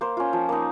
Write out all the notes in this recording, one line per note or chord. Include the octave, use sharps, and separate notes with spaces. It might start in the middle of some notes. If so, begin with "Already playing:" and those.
A#3 C5
C#4 F4
F3
A#3 D#4